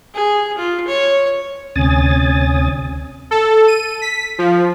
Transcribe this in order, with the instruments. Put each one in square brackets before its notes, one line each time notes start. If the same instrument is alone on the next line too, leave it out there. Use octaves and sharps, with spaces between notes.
[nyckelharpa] G#4
F4
C#5
[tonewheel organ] D2 C3 C#4 G#5 D#6 A6
[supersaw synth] A4
D#7
B6
F3